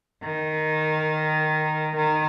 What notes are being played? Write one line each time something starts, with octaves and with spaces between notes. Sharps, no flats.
D#3
D#3